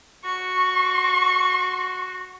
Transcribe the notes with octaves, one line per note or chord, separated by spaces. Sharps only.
F#4 C#6